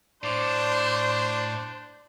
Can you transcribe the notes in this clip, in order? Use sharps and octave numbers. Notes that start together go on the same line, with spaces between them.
A2 D4 C5 D5